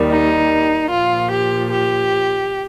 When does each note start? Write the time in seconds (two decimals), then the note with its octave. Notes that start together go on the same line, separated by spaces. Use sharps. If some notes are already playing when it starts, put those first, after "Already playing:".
Already playing: D#2 D#3 G3
0.10 D#4
0.91 A#2 F3 F4
1.32 G4
1.71 G4